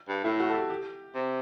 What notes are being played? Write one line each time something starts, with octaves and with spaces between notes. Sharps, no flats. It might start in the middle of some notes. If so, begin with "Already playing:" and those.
G2
A2 E4
F#4
A4
G4
G4
C3